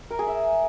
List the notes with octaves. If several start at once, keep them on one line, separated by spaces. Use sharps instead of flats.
A#4
G#4
E5